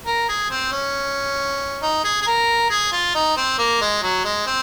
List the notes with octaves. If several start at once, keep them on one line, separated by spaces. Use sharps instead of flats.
A#4
G#4
C4
C#4
D#4
G#4
G#4
A#4
G#4
F4
D#4
C4
A#3
G#3
F#3
G#3
C4